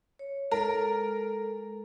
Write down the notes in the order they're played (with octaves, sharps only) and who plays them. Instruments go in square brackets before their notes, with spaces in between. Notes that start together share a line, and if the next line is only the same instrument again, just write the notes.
[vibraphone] C#5
[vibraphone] G#3 A4 [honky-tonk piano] A#4